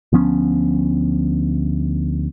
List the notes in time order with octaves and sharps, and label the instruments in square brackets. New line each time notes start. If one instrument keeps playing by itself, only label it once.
[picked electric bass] D2 F3 B3 C#4